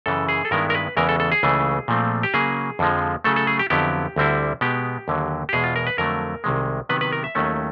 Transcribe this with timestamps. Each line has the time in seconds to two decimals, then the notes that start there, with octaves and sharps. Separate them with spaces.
0.06 F#2 C#3 E3 A4
0.29 G#4
0.45 A4
0.51 G2 D#3 G#3 B3 E4 A#4
0.70 A#4
0.75 B4
0.97 E2 C#3 E3 G#3 A#4
1.09 A4
1.20 A4
1.32 G#4
1.43 C#2 C#3 E3 A3
1.88 A#2 F3 A3 C4
2.23 G4
2.34 C#3 F#3 A#3 G#4
2.79 F2 D3 F3 G#3
3.24 C#3 F#3 A3 A4
3.36 A4
3.47 G#4
3.59 G4
3.70 F2 D3 F#3 B3 E4 G4
4.16 D2 D3 G3 C4 E4
4.61 B2 G#3 B3 G4
5.08 D#2 D3 F#3
5.49 G4
5.53 E2 B2 G#3 G#4
5.64 F4
5.76 A#4
5.87 B4
5.98 F2 D3 F#3 A3 A#4
6.44 C2 C3 D#3 G#3
6.89 C3 D#3 F#3 B3 B4
7.01 B4
7.12 A#4
7.24 E5
7.35 D#2 D#3 F#3 A3 C#4